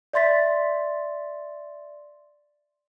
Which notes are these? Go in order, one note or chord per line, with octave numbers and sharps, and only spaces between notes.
D5 E5 C6 A6 B6